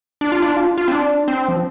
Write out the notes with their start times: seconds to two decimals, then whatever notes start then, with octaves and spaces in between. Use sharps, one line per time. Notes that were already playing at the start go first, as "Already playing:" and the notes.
0.21 D4
0.32 F4
0.42 D4
0.57 F4
0.78 F4
0.88 C4
0.92 D4
1.28 C4
1.48 F3